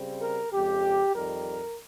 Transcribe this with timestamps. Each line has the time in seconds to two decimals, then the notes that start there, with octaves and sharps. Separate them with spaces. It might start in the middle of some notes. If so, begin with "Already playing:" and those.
Already playing: C#3 G3 C4
0.21 A#4
0.52 F2 C#3 G#3 G4
1.14 F2 D#3 G3 A#4